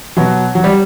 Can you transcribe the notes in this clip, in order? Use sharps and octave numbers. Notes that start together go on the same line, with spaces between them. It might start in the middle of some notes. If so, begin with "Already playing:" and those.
B2 F#3
F#3
G3